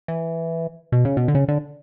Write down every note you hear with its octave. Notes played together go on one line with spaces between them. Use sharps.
E3
B2
C#3
B2
D3
C#3
D3